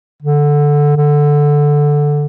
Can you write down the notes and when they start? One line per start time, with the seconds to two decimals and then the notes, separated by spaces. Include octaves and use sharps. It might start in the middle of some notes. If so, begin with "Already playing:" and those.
0.22 D3
0.97 D3